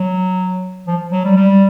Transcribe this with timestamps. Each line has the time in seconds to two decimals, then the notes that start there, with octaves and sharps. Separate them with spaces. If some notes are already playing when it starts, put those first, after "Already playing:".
Already playing: F#3
0.87 F3
1.12 F#3
1.24 G3
1.36 G3